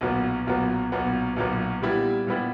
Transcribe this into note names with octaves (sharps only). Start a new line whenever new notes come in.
B1 A#2 F#3 B3
B1 A#2 F#3 B3
B1 A#2 F#3 B3
B1 A#2 F#3 B3
A#2 G3 B3 E4 G4
A#2 G3 B3 E4 G4